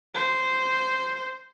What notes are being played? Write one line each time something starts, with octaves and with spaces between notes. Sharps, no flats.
C5